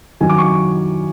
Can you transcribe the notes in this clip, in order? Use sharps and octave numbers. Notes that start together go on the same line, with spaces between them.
F#2 D#3 F#3 G#5
D6
C#6